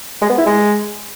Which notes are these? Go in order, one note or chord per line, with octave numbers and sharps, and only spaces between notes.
G#3
B3
E4
G#3